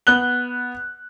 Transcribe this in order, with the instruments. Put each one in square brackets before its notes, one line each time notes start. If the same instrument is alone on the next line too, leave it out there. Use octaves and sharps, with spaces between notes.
[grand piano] B3 F#6 G7